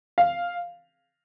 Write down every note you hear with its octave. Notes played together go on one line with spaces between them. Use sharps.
F5